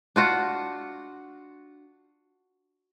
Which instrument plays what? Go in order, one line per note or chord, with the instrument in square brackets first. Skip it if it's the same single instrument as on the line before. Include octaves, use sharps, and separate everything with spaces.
[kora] D4 F4 F#4